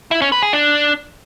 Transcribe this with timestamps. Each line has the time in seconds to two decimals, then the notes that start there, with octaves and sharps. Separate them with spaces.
0.11 E4
0.22 C#4
0.32 B4
0.43 G#4
0.53 D4